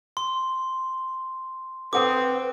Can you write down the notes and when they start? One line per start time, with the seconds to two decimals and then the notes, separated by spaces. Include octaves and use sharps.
0.17 C6
1.93 C4 A4 B4 F#5 D6 D#6